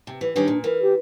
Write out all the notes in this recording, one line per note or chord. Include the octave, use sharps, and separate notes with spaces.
C3
E3
D#3 G3 C#4 D4
A#2
E3 A#4
G4